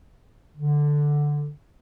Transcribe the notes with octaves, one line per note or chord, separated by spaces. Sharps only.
D3